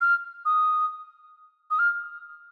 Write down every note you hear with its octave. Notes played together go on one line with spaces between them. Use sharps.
F6
D#6
D#6
F6